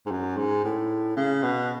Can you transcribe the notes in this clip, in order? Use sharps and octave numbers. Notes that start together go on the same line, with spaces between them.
G#2
F#2
G#2
A2
C#3
B2